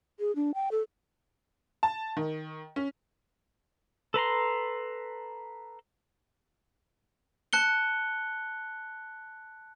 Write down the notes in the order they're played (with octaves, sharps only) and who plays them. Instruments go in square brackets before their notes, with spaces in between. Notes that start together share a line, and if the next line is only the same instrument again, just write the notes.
[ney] G#4
D4
G5
A4
[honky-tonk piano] A5
D#3
C#4
[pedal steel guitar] A4 B4 A#5 C6
[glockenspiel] A5 F#6 C#7 G7